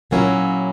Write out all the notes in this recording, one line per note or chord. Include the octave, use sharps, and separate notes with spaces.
A#2 F#3 A#3 C#4 E4